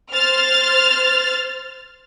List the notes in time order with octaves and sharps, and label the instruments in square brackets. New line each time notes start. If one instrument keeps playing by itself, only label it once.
[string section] C5 F6 A6